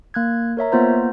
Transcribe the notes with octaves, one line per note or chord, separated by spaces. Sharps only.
A#3 F#6 G#6
A#4 C#5 E5 A#5
A#3 B3 F4 C5 A#5